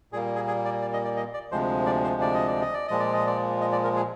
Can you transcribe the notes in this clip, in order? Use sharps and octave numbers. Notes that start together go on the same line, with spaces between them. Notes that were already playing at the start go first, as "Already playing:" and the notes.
A#2 G3 A#3 G#4
G#4
G#4
D5
D5
D#5
D5
D#5
D5
D2 C3 F3 G#3 C5
D5
C5
D5
D#5
D5
D#5
D5
A#2 F3 G#3 D#5
D5
D#5
D5
D#5
D5
A#4
G#4